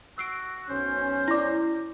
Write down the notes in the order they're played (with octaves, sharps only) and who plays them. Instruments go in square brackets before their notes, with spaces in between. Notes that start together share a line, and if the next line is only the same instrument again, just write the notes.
[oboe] F#4 [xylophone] E6 C7 D7
[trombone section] B1 C#4 [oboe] C5
[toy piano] E4 D6 [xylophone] D5 A#6